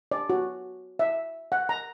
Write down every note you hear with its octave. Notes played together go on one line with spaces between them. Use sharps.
D5
F#4
E5
F#5
A#5